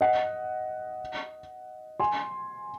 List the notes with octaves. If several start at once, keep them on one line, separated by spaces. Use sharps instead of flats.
D#5 F#5
G#5 C6